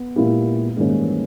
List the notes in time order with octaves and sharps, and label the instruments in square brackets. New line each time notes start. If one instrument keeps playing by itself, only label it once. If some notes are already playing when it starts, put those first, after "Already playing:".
Already playing: [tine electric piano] B3
[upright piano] A#2 A#3 E4 G4 [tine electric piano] G#3
[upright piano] G#2 D#3 A#3 C#4 [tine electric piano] G#3
[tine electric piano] G3
E3